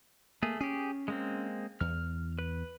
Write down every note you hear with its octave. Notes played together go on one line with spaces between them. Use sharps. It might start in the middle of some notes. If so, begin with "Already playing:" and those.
A3 A#3 G#4
C#4 G4 G#4
G#3 A#3 C4
E2 F6
B4